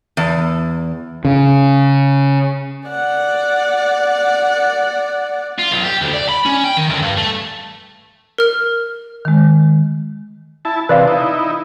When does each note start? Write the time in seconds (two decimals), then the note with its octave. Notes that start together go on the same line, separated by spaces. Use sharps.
0.17 E2
1.25 C#3
2.88 D5 F#5
5.59 F4
5.71 B1
5.84 G4
6.01 D2
6.13 D5
6.29 B5
6.46 C#4
6.64 G5
6.77 D#3
6.90 D2
7.02 G2
7.18 A3
8.38 A#4 F6
9.25 D#3 G#3
10.65 E4 A5
10.89 C3 E3 B4 D5 F5
11.08 D#4 E4